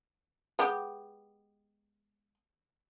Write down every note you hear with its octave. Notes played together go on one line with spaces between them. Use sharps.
G#3 B3 G4